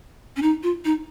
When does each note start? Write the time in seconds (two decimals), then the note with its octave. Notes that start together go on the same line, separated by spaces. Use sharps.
0.36 C#4
0.42 D#4
0.63 F4
0.85 D#4